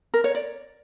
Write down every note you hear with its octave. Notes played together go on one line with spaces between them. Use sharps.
A#4
C#5
D5